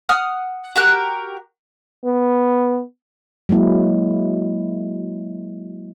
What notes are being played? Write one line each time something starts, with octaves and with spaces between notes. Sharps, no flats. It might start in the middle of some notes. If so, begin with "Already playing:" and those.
F#5 D#6 F6
F#4 G4 A#4 F#6
B3
F#3 G#3 A#3 E4